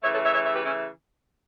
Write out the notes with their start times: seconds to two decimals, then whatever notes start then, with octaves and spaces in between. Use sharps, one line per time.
0.02 C#3 E3 A3 C#5 E5
0.12 A4 C#5
0.23 C#5 E5
0.33 C#5 E5
0.44 C#5 E5
0.54 G4 B4
0.65 C#4 E4